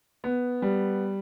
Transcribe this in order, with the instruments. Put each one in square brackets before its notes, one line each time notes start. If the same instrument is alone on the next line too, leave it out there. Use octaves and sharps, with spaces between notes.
[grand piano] B3
G3